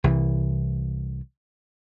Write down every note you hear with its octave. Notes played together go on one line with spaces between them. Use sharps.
C2 E3